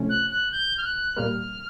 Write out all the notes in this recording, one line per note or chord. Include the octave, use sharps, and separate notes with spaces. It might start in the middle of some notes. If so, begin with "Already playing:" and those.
Already playing: C3 F3 A3 C#4
F#6
F#6
G6
F6
F#6
A#2 G3 A#3 F6